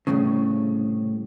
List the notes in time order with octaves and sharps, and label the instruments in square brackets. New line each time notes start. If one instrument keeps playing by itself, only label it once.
[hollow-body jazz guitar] C2 F#2 A2 C#3